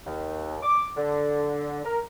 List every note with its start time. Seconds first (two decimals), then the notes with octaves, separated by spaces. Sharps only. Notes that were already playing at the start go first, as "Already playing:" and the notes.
0.06 D#2
0.62 D6
0.97 D3
1.84 A#4